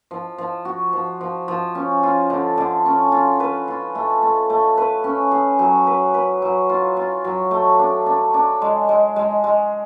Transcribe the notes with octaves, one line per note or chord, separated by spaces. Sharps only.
F3
F3
F#4
F3
F3
F3
C#4
F4
D3
D3
C#4
F4
B4
F4
A3
A3
A3
B4
C#4
G#4
F#3
B4
B4
F#3
F4
F4
F#3
A3
D4
D4
D4
G#3
G#3
G#3
G#3